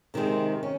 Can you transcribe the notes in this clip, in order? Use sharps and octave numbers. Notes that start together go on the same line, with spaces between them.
C3 D#3 G#3 C4
C#4